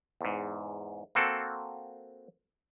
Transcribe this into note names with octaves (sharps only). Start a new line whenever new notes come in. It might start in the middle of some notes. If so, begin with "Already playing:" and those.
E2 G#2
A#3 C4 F#4 A4